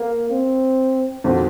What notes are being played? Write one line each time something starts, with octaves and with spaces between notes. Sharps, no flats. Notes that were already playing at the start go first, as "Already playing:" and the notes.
Already playing: A#3
C4
F2 D#3 G#3 C4 F#4